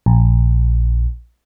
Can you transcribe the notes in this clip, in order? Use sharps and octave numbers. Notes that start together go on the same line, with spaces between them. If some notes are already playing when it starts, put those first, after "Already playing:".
A#1